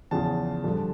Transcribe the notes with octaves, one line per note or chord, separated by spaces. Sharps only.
E2 C#3 F3 A5
G2 D3 F3